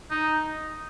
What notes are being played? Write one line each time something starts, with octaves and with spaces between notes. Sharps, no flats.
D#4